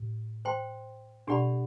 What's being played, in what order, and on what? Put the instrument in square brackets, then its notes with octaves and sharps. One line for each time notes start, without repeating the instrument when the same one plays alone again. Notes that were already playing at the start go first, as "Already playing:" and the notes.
Already playing: [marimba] A2
[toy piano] C5 G5 C6
[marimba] B2 [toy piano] D4 G4 D5 F#5 B5